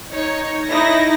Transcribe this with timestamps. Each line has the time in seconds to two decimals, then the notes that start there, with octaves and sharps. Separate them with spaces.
0.13 D#4 C#5
0.68 D#4 E4 A#6